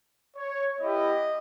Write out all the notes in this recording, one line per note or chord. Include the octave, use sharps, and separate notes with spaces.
C#5
B3 E4 G4 D#5